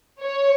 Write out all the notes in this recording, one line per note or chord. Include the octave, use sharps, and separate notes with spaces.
C#5